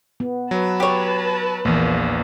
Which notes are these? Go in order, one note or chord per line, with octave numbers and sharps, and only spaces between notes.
B3
F#3 B4 A5
G4 C#5
A#1 E2 E3 A#3